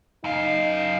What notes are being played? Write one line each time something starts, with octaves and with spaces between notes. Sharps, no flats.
F#2 D#4 F5